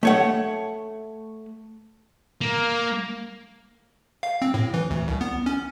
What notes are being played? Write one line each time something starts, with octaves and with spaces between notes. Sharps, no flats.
A3 C#5 F#5
A#3
F5
C4
A2
E3
D2
C2
B3
C#4